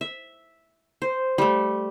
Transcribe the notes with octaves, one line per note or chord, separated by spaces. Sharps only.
E5
C5
G3 A3